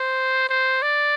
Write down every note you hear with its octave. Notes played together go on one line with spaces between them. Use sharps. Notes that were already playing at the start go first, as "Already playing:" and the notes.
Already playing: C5
C5
D5